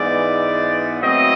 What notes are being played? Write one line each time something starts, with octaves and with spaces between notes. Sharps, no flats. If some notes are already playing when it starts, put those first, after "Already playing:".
Already playing: G#2 E3 G#3 B3 D5
B2 F#3 A3 C4 E4 D#5